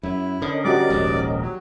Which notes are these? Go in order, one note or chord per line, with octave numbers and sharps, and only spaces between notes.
F#2 E4
D3 C#4 A#4 D#5
G3 F#4 D5 D6
D#1 A#1 G#2
F#3